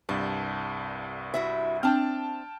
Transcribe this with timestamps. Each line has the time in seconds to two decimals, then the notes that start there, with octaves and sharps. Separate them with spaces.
0.09 C2 G2 A5
1.34 E4 F#4 E5
1.83 C4 D4 G5 A5 F6